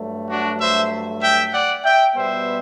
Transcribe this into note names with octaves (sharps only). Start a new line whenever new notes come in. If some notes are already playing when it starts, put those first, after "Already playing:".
Already playing: G2 F#3 A3
D4 F#4
C5 E5
E5 G5
D5 F#5
E5 G5
B2 G3 B3 C5 E5